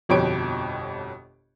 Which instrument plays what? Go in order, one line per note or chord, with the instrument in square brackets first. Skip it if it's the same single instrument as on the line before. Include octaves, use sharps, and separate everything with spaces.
[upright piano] G1 F2 B2 G4 C#5 D7